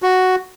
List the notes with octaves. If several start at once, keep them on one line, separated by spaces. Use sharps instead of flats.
F#4